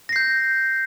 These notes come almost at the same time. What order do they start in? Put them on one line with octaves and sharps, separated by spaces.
A#6 C7 G6